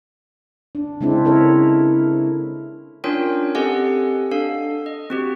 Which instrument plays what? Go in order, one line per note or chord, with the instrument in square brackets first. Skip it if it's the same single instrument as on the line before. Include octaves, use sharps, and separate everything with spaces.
[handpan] D4
C#3 G#3 C4 D4 E4
E4 A4 A#4 C#5
[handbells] C#4 D4 F4 A#4 C#5 G5
C4 G4 A4 D#5 F#5 G#5
D4 A4 F5
D#5
C4 F#4 G4